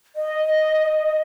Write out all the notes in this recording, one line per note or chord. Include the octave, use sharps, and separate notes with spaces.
D#5